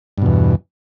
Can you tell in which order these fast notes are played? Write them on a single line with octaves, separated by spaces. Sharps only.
G2 B2 E2